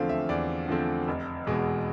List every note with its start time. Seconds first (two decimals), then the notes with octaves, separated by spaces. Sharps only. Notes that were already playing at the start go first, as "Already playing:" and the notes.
Already playing: E2 D3 F3 A3 C4 F5
0.09 E5
0.29 E2 D5
0.68 D3 F3 A3 C4
1.08 F1
1.46 E2 B2 G#3